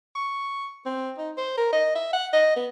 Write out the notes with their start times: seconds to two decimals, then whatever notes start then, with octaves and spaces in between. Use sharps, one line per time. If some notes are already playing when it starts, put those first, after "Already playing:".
0.15 C#6
0.86 C4
1.18 D#4
1.37 C5
1.58 A#4
1.73 D#5
1.95 E5
2.13 F#5
2.33 D#5
2.56 B3